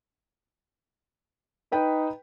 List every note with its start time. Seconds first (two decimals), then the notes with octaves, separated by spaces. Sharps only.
1.72 D#4 B4 G5 B5